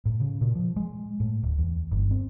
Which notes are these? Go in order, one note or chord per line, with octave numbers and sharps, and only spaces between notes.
A2
C#3
A#2
F3
G#3
A2
D1
E2
G1
C4